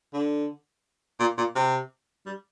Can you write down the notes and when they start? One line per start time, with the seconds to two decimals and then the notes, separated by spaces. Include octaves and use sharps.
0.13 D3
1.20 A#2
1.37 A#2
1.55 C3
2.26 G3